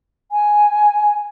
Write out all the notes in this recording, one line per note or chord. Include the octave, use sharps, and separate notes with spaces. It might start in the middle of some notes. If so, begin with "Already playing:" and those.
G#5